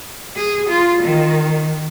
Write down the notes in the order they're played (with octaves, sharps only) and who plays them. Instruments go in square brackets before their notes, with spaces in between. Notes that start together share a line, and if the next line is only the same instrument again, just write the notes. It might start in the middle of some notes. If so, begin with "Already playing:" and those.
[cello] G#4
F4
D#3